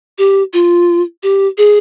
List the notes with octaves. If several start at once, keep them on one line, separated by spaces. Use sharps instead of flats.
G4
F4
G4
G#4